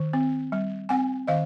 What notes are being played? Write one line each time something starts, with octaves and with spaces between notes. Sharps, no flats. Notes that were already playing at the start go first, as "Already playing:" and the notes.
Already playing: D#3
C4
G3
C4 F#5 G#5
D#3 D#5 F5